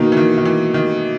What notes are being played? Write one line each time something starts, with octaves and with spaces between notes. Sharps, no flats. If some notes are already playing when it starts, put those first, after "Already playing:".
Already playing: B2 D#3 A#3 D#4
E3
D#3
D#3
E3
D#3